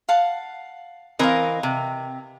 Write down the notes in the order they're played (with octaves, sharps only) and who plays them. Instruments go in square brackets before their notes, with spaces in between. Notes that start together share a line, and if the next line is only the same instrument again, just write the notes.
[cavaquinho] F5 F#5 A5
[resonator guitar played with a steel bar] E3 C4 A#4 [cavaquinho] D#5 F5
[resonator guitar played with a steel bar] C3